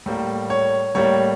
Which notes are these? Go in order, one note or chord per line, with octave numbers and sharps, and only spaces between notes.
A2 G3 A#3
C#5
A2 G3 A#3 C#5